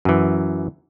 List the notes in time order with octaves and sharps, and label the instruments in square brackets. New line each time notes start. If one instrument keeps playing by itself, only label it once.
[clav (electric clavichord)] F#2 E3